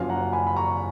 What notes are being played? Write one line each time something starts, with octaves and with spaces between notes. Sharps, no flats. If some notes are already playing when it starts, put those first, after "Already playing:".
Already playing: F#1 F#2 F3 F5 G#5
F#5 A#5
G#5 B5
B5
A#5 C#6